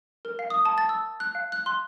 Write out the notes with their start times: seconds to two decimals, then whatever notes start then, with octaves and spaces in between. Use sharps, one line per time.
0.25 A#4
0.39 F5
0.50 D#6
0.65 A5
0.78 A6
0.89 E6
1.20 F#6
1.35 F5
1.52 F#6
1.66 C6